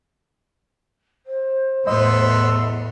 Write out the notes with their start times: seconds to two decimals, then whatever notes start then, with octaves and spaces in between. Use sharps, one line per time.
1.26 C5
1.87 E2 A2 B3 D#5 C6 E6